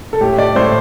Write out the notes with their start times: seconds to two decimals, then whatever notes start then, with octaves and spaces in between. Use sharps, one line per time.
0.13 A4
0.21 A2 G4
0.38 D5
0.56 A2 C5